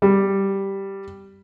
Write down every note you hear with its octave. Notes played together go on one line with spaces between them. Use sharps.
G3